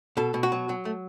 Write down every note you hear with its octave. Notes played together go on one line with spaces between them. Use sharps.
B2 A4
B2
F#4
F#3
F#3
A3